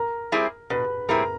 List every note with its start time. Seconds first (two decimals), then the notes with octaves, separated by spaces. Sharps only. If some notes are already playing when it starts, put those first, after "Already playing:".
Already playing: A#4 A#5
0.32 G3 C4 E4 G#4
0.70 B2 B4 B5
1.09 G3 C4 E4 G#4 A#4 A#5